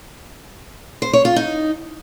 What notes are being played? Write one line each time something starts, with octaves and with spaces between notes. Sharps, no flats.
C5
C#5
F4
D#4